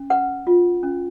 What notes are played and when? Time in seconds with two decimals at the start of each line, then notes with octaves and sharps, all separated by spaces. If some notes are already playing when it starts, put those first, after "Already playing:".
Already playing: C#4
0.10 B4 F#5
0.47 F4
0.83 C#4